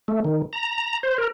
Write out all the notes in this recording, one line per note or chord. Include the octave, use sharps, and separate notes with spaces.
A3
D#3
A#5
C5
A#4